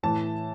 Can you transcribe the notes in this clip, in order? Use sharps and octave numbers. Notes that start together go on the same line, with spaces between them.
A2 E3 A5